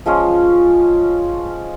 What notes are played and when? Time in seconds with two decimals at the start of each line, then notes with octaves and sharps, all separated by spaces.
0.06 F3 G#3 C#4 F4